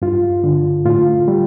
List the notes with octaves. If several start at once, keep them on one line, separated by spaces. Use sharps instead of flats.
G2 F4
D3
A2 F4
G3